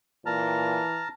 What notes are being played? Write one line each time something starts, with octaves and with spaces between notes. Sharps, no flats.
A#2 E3 A5 A#5 F6